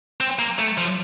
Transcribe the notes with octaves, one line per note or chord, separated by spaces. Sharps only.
C4
A#3
A3
F3